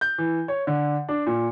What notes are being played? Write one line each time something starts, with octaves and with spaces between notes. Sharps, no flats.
G6
E3
C#5
D3
D4
A#2